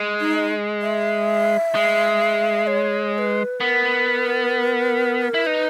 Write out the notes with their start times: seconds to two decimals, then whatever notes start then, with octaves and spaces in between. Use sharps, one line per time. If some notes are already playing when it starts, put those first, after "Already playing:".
Already playing: G#3
0.20 D#4
0.82 E5
1.75 G#3
2.67 C#5
3.14 C#5
3.18 B4
3.60 B3 A#4
5.34 E4
5.45 D#4 B4